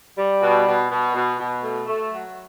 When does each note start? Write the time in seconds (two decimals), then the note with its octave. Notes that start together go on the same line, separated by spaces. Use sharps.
0.17 G3
0.42 B2
0.67 B2
0.90 B2
1.15 B2
1.39 B2
1.63 A3
1.88 A3
2.11 F#3